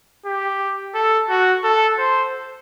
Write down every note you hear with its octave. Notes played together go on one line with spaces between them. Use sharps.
G4
A4
F#4
A4
C5